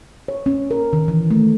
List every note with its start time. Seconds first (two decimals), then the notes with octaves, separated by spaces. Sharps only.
0.28 C#5
0.46 C#4
0.71 A#4
0.93 D#3
1.08 E3
1.31 A3